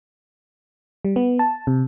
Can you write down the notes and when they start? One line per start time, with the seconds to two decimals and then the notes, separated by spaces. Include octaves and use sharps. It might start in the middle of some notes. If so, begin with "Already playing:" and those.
1.05 G3
1.16 B3
1.39 A5
1.67 C3